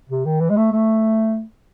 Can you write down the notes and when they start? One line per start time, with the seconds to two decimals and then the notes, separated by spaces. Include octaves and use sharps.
0.09 C3
0.25 D#3
0.41 E3
0.50 G#3
0.57 A3
0.72 A3